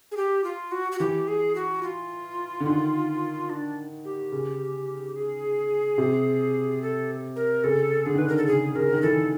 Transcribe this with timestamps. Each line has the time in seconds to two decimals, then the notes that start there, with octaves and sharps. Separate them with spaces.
0.12 G#4
0.17 G4
0.44 F4
0.72 F#4
0.92 F#4
0.99 E3 G4
1.28 G#4
1.55 F#4
1.83 F4
2.60 D3
2.66 D#3
3.50 D4
4.05 G4
4.32 C#3
5.16 G#4
5.98 C3
6.82 A4
7.36 A#4
7.64 C#3 A4
8.06 D3 G#4
8.14 D#3
8.18 D3 B4
8.28 A#4
8.37 A4
8.47 C#3 G#4
8.75 C#3 A#4
8.93 D#3
9.02 E3 A4